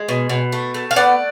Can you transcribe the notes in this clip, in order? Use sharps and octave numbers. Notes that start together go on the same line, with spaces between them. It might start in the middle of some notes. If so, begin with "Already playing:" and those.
Already playing: G#3
B2
B2
A3
A3
F5
B3 D5 F#5